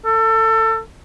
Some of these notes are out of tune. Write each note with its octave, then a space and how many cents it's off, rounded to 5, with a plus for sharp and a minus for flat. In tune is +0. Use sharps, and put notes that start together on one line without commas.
A4 +25